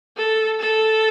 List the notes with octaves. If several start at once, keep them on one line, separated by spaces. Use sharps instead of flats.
A4
A4